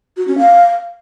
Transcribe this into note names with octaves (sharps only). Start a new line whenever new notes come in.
F#4
C#4
F5